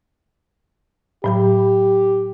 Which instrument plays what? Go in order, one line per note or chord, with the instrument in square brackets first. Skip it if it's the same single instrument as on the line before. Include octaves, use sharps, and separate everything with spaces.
[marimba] A2 F#3 B5 [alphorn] G4